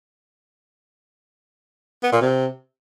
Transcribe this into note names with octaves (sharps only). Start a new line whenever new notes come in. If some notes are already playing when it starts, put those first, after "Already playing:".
B3
A#2
C3